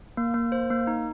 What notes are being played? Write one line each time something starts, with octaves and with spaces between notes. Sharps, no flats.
A#3
A#3
C5
A#3
D#4